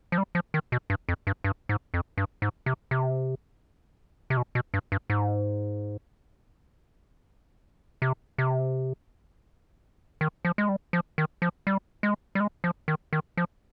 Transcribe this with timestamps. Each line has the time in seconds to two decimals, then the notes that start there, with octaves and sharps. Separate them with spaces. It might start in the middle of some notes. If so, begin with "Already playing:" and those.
0.12 F3
0.18 G3
0.35 F3
0.54 D#3
0.72 B2
0.90 G2
1.09 F2
1.27 G2
1.44 G2
1.69 G#2
1.94 F2
2.18 G2
2.42 G#2
2.66 C3
2.91 C3
4.30 C3
4.37 B2
4.55 B2
4.74 G2
4.92 G2
5.10 G#2
8.02 C3
8.38 C3
10.21 D#3
10.45 F3
10.58 G#3
10.69 G3
10.93 F3
11.18 D#3
11.42 F3
11.67 G3
12.03 G#3
12.35 G3
12.40 G#3
12.64 F3
12.88 D#3
13.13 D#3
13.37 F3